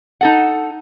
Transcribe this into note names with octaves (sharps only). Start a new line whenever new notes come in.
D#4 A4 F#5